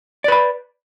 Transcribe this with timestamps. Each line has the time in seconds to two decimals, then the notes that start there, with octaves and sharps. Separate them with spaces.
0.24 D5
0.28 B4
0.32 B5